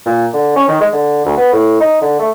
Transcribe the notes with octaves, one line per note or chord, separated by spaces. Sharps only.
A#2
D3
C#4
D#3
G#3
D3
D2
B3
A2
D#4
D3
A3